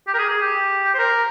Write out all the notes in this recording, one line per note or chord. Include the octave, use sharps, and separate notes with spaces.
G4
A#4
G#4
G#4
G4
C5
A#4